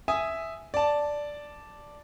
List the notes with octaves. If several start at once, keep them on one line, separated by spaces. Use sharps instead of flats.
E5 G#5 D#6
D5 A5